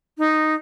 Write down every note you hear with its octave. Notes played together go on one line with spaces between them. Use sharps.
D#4